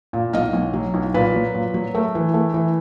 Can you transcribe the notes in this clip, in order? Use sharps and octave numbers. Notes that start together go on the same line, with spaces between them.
A#2
B1 D#5 F5
B1
F#3
B1
A#2 B4
F#3
A#2
F#3
A3 A#4
E3
A3
E3